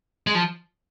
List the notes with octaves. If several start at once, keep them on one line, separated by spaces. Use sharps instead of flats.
G#3
F3